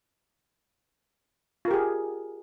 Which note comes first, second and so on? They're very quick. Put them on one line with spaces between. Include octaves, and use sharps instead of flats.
F4 A#4 G4 G#4